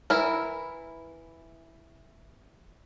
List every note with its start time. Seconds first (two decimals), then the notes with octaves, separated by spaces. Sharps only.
0.10 E3 E4 A#4